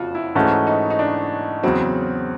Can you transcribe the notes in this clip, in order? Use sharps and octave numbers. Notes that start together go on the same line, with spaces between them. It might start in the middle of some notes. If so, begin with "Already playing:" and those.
Already playing: F#1 F2 C#3 F4 F#4
E4
G#2 E3 A3 C#4 D#4 F#4
D#4
D#4
D4
E2 C#3 F#3 C4